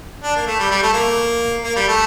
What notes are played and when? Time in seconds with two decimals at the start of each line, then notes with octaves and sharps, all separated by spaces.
0.23 D4
0.36 A#3
0.46 A3
0.59 G3
0.71 G3
0.82 A3
0.93 A#3
1.64 A#3
1.76 G3
1.88 A3